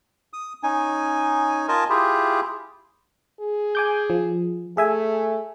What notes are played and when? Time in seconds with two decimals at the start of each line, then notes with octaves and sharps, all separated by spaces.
0.33 D#6
0.63 C#4 D#4 G#5
1.69 F4 A#4 D#5 G#5 A5
1.90 E4 F4 G4 G#4
3.40 G#4
3.75 G#5 D6 G6
4.10 F3
4.77 A3 G#4 E5 G#5